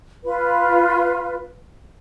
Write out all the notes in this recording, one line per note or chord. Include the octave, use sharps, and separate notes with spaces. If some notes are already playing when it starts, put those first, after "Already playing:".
F4 B4